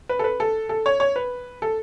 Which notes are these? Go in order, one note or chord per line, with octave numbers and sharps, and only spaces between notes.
B4
A4
B4
A4
A4
C#5
C#5
B4
A4